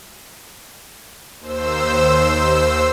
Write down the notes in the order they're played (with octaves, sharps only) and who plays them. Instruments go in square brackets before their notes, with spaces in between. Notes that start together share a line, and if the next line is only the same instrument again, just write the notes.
[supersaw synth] D#2 C5 E6